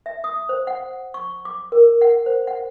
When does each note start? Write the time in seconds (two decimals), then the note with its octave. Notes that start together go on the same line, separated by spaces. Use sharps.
0.06 E5
0.24 D#6
0.49 C5
0.67 F#5
1.14 C#6
1.45 D6
1.72 A#4
2.01 F#5
2.26 C5
2.47 F#5